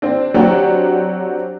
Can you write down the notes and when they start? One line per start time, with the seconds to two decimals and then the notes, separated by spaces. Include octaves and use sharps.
0.02 C4 D4
0.34 F#3 C4 D4 F#4 G4